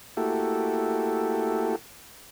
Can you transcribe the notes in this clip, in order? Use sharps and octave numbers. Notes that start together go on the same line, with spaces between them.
A3 A#3 E4 F#4 G4 A4